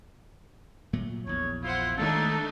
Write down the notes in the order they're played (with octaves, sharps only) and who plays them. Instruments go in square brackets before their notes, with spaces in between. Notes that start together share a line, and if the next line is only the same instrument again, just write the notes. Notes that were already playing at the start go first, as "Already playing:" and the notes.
[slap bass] A#2 F#3 A3
[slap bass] A#1 E2 [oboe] C#5
[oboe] E4 [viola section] F4 C5 F#5
[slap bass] D#3 G#3 C4 [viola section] A3 D4 D#4 [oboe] A4